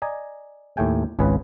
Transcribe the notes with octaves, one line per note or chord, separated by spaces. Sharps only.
D5 D#5 G#5 A#5
D#2 A2 A3 G5 G#5
G#1 C#2 C#3 G#4 B4